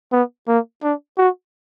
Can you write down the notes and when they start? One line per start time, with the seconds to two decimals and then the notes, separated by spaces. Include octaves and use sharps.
0.12 B3
0.48 A#3
0.83 D4
1.18 F#4